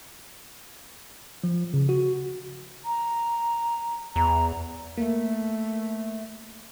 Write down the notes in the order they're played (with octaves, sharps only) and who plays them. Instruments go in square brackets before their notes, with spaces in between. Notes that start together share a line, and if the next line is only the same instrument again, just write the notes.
[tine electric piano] F3
C#3
F#4
[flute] A#5
[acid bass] E2 [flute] A#5
[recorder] A3 [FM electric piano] A#3